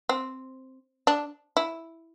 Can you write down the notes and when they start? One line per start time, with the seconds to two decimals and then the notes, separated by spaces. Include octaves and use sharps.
0.09 C4
1.07 D4
1.57 E4